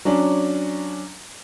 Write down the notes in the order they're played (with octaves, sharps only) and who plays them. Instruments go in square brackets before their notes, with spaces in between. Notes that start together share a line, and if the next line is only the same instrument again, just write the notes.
[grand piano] F#3 C#4 D4